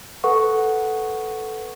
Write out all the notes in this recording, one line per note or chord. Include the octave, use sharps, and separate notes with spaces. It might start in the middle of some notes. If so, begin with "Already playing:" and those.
A4 B4 F#5 C#6